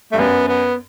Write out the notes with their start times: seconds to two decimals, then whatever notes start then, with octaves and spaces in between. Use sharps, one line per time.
0.12 G2 A3
0.19 F#2 B3
0.48 B3